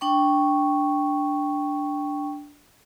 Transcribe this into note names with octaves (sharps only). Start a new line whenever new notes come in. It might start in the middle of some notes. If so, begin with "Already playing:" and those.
D4 G5 C#6